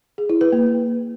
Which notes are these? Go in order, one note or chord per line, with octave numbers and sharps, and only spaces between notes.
G#4
E4
B4
A#3